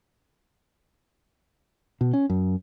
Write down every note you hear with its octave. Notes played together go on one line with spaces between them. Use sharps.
B2
C#4
F#2